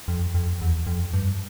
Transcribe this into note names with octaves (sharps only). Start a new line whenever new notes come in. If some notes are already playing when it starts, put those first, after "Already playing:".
F2
F2
E2
F2
G2